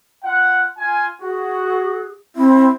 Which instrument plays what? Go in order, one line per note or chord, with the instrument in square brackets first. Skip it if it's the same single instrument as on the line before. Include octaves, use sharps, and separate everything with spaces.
[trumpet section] F4 F#5
F4 G#5
[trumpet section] F#4 [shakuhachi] G#4
[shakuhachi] C4 [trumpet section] E4